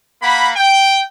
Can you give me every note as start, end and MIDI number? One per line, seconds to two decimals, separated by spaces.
0.22 0.50 58
0.22 0.50 78
0.22 0.50 83
0.56 1.00 79